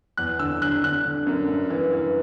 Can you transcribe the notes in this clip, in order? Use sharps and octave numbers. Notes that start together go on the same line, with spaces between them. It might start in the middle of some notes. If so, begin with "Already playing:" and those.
E2 F#6
D3 E6
D3 F#6
D3 F#6
D3
F#2
G2
E3
E3